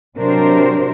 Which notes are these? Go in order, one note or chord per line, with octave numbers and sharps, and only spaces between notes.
C3 F#3 D4 A#4 C5